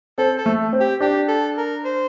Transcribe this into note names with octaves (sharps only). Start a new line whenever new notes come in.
C4 A4
A4
A3
C4
G4
D4 G4
A4
A#4
C5